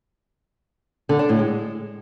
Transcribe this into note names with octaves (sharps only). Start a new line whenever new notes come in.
D3
D4
A2
G#3